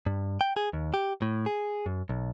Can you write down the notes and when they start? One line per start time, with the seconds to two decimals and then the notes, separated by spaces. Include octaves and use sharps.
0.06 G2
0.41 G5
0.57 G#4
0.73 D#2
0.94 G4
1.22 A2
1.46 G#4
1.86 F#2
2.09 B1